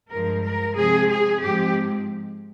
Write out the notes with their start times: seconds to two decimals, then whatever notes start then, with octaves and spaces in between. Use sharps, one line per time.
0.11 G2 F3 G#3 A#4
0.44 A#4
0.76 C3 F3 G#3 C4 G#4
1.09 G#4
1.41 G#2 F3 G#3 C4 G4